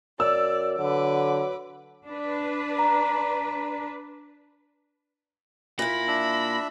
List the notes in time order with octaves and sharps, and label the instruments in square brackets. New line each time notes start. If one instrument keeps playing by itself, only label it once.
[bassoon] F#2 [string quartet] D5 [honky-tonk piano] E6
[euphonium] D3 [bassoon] F#3 [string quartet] B4 D6
[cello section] D4 B4
[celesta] A#5
[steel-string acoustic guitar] A#2 E4 [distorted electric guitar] B5 [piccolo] A#6
[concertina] D4 E5